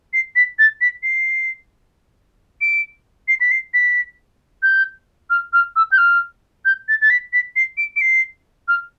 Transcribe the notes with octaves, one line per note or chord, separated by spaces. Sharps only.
C7
B6
A6
B6
C7
D7
C7
B6
C7
B6
G6
F6
F6
E6
G6
F6
G6
A6
A6
B6
B6
C7
D7
D7
C7
F6